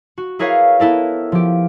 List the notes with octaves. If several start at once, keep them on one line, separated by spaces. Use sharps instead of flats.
F#4
E4 G#4 A#4 B4 C#5 F5
B3 E4 A4 A#4
F3 G4